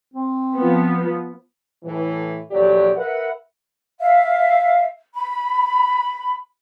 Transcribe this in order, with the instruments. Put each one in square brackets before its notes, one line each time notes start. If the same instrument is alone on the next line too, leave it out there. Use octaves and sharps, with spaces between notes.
[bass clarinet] C4
[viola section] F3 B3
[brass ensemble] A2 E3
A#1 E2 D3 F#3 G4 D5
A#4 B4 E5 F#5
[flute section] E5 F5
B5